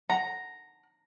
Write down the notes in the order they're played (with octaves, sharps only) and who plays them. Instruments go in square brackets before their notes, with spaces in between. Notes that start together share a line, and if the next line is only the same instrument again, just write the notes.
[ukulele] F#5 [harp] A#5